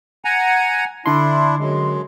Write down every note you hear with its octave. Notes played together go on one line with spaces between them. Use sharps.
F#5 G#5 A#5
D3 D4 E4 C6
F#2 G#3